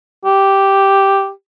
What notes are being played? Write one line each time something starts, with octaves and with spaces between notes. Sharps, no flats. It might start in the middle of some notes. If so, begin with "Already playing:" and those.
G4